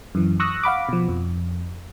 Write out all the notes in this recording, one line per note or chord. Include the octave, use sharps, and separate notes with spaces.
F#2 E3
C#6 D#6 E6 F#6 A#6
F5 F#5 B5 D6
B2 F3
F2